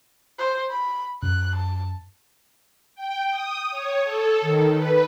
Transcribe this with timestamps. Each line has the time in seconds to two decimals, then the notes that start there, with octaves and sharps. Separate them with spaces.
0.39 C5
0.70 B5
1.23 F#2 F#6
1.56 A5
2.95 G5
3.30 D#6
3.70 C#5
4.02 A4
4.41 D#3
4.74 B4